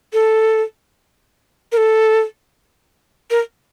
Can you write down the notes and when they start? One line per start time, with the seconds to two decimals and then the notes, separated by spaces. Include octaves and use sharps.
0.13 A4
1.72 A#4
1.77 A4
3.31 A#4